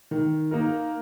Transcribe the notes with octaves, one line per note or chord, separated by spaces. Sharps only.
D#3
A#3 D#4 A#4